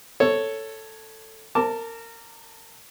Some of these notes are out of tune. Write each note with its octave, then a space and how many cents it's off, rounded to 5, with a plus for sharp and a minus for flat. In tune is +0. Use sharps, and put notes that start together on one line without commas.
A4 +10 C#5 +0
A#4 -25 A5 +5 D6 -5